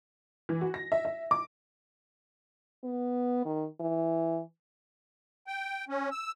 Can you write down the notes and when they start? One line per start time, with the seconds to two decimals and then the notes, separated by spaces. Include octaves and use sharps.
0.49 E3
0.61 F#4
0.74 A#6
0.92 E5
1.05 E5
1.31 D6
2.84 B3
3.45 D#3
3.80 E3
5.47 G5
5.89 C#4
6.12 E6